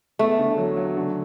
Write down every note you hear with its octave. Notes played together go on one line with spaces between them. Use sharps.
E2 A3
D3
F#3
F#3
D3